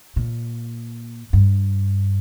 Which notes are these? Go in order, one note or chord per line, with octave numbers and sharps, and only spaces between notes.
A#2
G2